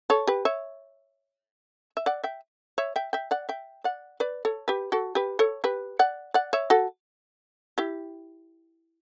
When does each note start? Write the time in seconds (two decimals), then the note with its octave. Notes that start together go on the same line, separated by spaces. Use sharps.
0.10 A4 C#5
0.27 G4 B4
0.45 C#5 E5
1.97 E5
2.06 D5 F#5
2.24 E5 G5
2.78 C#5 E5
2.96 E5 G5
3.13 E5 G5
3.31 D5 F#5
3.49 E5 G5
3.84 D5 F#5
4.20 B4 D5
4.45 A4 C#5
4.68 G4 B4
4.92 F#4 A4
5.15 G4 B4
5.39 A4 C#5
5.64 G4 B4
5.99 D5 F#5
6.34 D5 F#5
6.53 C#5 E5
6.70 F#4 A4
7.78 E4 G4